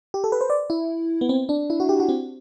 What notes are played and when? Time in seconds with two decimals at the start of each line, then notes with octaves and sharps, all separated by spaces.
0.14 G4
0.24 A4
0.32 B4
0.41 C5
0.50 D5
0.70 E4
1.21 B3
1.29 C4
1.49 D4
1.70 E4
1.80 F#4
1.89 G4
2.00 F#4
2.09 C4